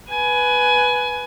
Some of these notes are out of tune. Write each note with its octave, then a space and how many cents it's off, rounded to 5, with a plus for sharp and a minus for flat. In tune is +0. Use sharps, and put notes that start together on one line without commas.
B4 +0 G#5 +20